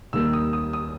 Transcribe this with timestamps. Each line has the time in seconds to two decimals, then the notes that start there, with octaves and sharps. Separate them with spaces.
0.13 D#2 D#3 G3 A#3 E6
0.33 D#6
0.53 D#6
0.73 D#6